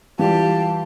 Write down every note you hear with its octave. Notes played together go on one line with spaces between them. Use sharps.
E3 G3 F4 G4 F5 A5